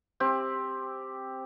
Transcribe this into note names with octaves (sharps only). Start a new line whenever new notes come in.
C4 G4